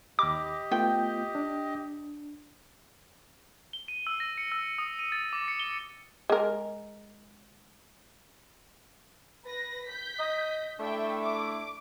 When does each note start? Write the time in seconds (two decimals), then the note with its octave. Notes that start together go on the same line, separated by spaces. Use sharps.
0.19 D#2 G4 D#5 B5 D6
0.71 A3 B3 F4 G5
1.35 D4
3.73 G7
3.88 D#7
4.07 E6
4.20 A#6
4.38 C#7
4.52 E6
4.78 D#6
4.99 D#7
5.12 A6
5.33 D6
5.48 C#7
5.60 G7
6.30 G#3 A#4
9.46 B4 A#6
9.86 G6 B6
10.19 D#5
10.79 A3 D4 E4 E5 G5
11.22 D6